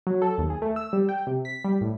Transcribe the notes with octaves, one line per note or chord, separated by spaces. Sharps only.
F#3
A4
D#2
G#4
A3
E6
G3
G5
C3
B6
G3
A2